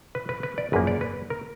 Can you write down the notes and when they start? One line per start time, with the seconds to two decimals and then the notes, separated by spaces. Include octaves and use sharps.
0.15 B4
0.29 B4
0.43 B4
0.58 D5
0.72 G#1 F#2 F3 A#3 B4
0.87 D5
1.01 B4
1.30 A#4